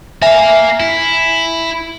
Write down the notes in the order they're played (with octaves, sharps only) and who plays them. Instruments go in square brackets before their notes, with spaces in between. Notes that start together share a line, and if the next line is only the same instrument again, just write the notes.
[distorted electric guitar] A#4 F5 [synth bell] E5 G#5
[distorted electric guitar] E4